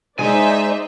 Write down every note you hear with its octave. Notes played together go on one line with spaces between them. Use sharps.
G#3 D#4 C5 D5 E5 G#5